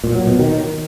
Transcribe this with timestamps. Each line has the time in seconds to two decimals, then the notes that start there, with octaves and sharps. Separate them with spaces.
0.04 A#2
0.15 F#3
0.27 B2
0.39 D#3